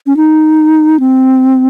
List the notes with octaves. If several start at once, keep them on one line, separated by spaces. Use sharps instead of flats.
C#4
D#4
C4